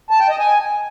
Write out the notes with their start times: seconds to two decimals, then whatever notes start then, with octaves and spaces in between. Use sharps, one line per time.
0.11 A5
0.20 G5
0.29 D#5
0.39 G#5